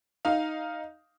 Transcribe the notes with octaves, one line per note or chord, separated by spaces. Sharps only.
D#4 F5